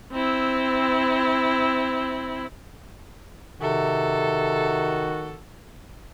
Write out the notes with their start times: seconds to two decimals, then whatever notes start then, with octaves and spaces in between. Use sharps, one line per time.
0.12 C4 E4
3.62 C3 D#3 F#4 A4